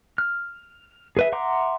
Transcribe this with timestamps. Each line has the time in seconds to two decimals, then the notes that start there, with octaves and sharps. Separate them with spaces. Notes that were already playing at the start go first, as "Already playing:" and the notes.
0.18 F6
1.17 G#4 B4 E5
1.32 E5 F#5 A#5 C6 D6